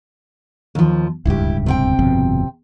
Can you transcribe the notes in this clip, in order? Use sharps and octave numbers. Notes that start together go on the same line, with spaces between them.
D#2 F3
D1 C#2 G2 E4 G4
C3 C4 G5
G1 F2 B2